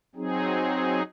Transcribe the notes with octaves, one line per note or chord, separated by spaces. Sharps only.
F#3 C4 D#4 G#4